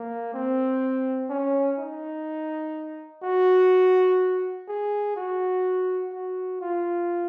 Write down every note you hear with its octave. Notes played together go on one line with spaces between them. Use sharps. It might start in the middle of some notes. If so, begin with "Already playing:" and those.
Already playing: A#3
C4
C#4
D#4
F#4
G#4
F#4
F#4
F4